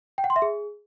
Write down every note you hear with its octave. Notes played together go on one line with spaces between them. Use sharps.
G5
F#5
C6
E5
G#4